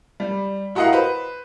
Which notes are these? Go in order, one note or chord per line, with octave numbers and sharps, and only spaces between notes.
G3
E4 F#4 A#4 D#5 F5 F#5
B4 C5